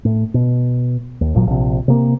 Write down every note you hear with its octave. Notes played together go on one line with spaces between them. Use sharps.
A2
B2
D#2
G#1 A#2 F#3
A#1 C3
C3 A#3